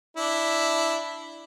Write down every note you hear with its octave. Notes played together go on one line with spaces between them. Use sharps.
D4 E4